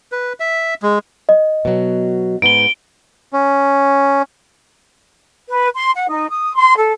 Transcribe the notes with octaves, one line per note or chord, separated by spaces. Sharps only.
B4
E5
G#3
D#5
B2 F#3
G#2 B3 D#4 D7 G7
C#4
B4
C6
F#5
D#4
D#6
C6
A4